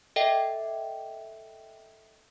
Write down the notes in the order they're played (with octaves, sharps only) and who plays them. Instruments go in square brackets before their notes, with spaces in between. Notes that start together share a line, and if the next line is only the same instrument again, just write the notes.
[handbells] A4 D#5 E5 G5